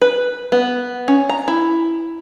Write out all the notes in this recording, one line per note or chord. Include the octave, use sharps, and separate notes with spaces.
B4
B3
C#4
A#5
E4